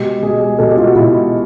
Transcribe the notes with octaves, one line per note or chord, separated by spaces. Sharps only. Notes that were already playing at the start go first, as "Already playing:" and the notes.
Already playing: B2 G#3 G4
B2 G#3 G#4
G#4
B2 G#3 A4
G4
F4
F#4
B2 G#3 E4